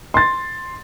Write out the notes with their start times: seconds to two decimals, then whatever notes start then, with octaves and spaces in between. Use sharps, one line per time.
0.14 C6 A6